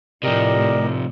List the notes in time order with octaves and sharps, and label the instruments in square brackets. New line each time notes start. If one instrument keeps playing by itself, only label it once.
[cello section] A2 [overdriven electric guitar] C3 F3 [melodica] G4 A#4 D#5 [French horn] D5